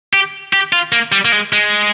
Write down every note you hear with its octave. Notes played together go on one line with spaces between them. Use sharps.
G4
G4
F4
A#3
G3
A#3
G#3
G#3